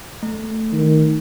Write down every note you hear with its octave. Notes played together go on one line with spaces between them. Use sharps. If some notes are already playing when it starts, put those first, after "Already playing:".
A3
D#3